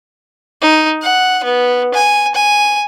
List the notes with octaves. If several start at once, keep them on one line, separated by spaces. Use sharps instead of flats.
D#4
F#5
B3
G#5
G#5